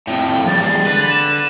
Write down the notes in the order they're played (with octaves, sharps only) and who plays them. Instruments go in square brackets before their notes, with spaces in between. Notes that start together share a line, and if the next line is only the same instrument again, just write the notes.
[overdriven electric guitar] F2 A2 [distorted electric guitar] G5
[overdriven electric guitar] E2 G2 [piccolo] A6
[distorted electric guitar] G#3
[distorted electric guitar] D3 [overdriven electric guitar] B4
[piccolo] E7